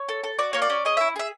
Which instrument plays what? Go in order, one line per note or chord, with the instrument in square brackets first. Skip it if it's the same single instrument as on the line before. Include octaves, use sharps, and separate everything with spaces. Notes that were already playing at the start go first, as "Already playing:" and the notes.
Already playing: [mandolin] C#5
A4
A4
F#4 D5
A#3 C#5
D5
C#4
G#4 D#5
E4 E5
G#4 E5